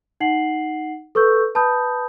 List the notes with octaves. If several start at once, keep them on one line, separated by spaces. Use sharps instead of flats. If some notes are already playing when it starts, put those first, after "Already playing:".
D#4 F#5 C7 F#7
A4 B4 C#6 E6 G6
B4 A5 B5 D#6 G6